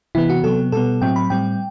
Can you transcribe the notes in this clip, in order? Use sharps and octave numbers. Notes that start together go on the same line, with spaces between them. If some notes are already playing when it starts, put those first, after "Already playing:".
C3 E3 B3 E4
F#4
C3 F#3 B3 A4
B2 G3 B3 A4
A2 F#3 C4 G5
B5
A2 G3 C4 G5